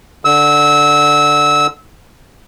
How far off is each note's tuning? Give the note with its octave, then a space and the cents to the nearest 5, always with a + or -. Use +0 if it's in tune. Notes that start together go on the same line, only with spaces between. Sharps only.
D3 +0 E6 -20